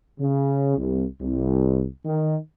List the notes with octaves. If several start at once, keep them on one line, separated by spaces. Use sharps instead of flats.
C#3
C2
C2
D#3